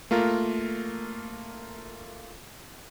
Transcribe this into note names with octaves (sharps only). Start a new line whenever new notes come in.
A3 A#3 F4 A#4